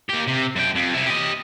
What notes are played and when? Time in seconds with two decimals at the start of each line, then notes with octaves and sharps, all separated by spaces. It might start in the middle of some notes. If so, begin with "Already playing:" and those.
0.10 A#3 G4
0.28 C3
0.56 F#2 G5
0.76 F2
0.94 C3 E4
1.07 G4 D#5